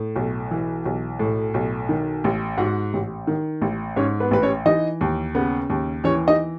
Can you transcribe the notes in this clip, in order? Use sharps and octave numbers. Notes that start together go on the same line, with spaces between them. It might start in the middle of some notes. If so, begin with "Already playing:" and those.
Already playing: A2
B1
E3
B1
A2
B1
D#3
A1
G#2 F#4 F#5
A1
D#3
A1
G#2 C#4 C#5
B3 B4
A1 B4
C#4 C#5
E3 D#4 D#5
D#2
C#3 B3 B4
D#2
E3 C#4 C#5
D#4 D#5